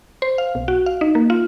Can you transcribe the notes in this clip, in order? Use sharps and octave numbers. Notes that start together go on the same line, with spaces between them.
C5
F5
B1
F#4
F5
D#4
A#3
F4